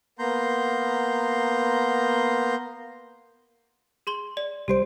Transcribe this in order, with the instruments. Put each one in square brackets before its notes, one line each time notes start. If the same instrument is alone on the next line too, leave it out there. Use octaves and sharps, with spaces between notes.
[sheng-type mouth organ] A#3 B3 A#5 C6 G6
[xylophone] G#4 C6 G7
D5
[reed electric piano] C2 G3 C5 [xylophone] G4 C7 D7